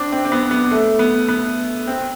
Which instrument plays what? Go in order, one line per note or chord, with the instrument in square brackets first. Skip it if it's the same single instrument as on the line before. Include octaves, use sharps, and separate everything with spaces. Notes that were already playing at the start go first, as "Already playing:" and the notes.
Already playing: [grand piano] C4 D4
C4
C4
B3
B3
A3
B3
B3
C4